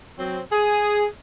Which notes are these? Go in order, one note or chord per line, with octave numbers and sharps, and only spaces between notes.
F#3 C4
G#4